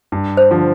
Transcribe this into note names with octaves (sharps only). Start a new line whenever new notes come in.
G2
C5
D3 F3